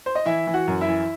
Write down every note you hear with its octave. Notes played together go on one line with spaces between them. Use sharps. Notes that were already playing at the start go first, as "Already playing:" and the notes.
C5
D#5
E3 E4 E5
E3
F#4 F#5
F#2
E4 E5
E3